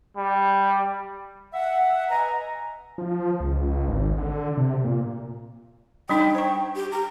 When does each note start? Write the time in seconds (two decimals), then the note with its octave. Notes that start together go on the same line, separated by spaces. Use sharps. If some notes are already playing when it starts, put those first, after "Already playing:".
0.17 G3
1.54 E5 F#5
2.10 B4 D#5 G#5 A#5
2.98 F3
3.40 C#2
3.88 G#1
4.18 D3
4.57 C3
4.84 A#2
6.09 G3 D4 D#4 G5
6.35 C5 C#6
6.76 G4
6.92 A#5